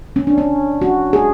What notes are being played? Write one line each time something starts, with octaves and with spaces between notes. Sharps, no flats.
C#4
D4
C#4
F#4
G#4